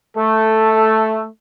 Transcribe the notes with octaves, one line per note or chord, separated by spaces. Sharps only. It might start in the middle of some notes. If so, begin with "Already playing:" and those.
A3 A4